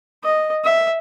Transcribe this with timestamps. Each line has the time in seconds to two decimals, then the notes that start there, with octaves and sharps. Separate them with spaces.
0.24 D#5
0.64 E5